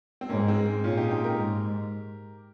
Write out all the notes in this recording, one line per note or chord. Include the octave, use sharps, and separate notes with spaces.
C4
G#2 A#3 C#4
G#3 C4
A#2 C#4 F4
D#4 G4
D#4 G4
G4 A#4
G#2